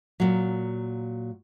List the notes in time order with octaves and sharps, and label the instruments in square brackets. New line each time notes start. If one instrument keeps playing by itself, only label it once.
[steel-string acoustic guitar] A#2 F#3